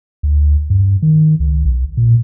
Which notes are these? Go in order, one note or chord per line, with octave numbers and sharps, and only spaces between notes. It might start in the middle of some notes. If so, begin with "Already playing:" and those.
D2
G2
D#3
C#2
B1
A#2